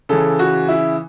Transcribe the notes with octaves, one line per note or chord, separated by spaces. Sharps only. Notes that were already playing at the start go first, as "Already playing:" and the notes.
C#3 E3 A4
F#4
E4